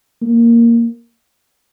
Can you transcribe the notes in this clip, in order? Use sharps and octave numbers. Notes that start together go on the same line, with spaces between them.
A#3